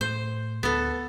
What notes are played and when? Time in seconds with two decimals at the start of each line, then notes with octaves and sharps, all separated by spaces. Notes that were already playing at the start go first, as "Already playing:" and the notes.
0.01 A2 C5
0.63 D2 B3 A4